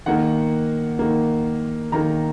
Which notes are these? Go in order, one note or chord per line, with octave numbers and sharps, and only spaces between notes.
D#3 A#3 F#5
D#3 A#3
D#3 A#3 A#5